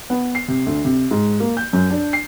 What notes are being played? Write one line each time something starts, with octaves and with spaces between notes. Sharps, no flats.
B3
C7
C3
D2
C3
G#2
A#3
G6
F#2
D4
C7